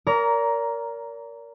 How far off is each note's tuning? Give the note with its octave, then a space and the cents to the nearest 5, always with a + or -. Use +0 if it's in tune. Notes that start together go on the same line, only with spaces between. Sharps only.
A#4 +0 D5 -40 A#5 +10